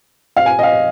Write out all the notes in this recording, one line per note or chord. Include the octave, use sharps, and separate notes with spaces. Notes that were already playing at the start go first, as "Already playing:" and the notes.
F5
G#5
D#5
F5